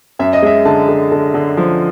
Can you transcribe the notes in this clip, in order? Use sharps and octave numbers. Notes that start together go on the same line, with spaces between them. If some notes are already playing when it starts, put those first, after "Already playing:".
F#2 E5
D#5
G#3 E5
D3 A5
D3
D3
D3
F3